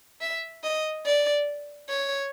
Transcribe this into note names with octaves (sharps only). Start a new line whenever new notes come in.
E5
D#5
D5
C#5